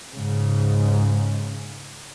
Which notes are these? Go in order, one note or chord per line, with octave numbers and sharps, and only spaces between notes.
G#2 C#3